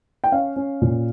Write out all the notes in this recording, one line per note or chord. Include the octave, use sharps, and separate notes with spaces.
G5
C#4 F5
C#4
A#2